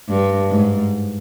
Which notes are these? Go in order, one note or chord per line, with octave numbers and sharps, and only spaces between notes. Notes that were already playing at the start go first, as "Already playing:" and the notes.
G2
G#2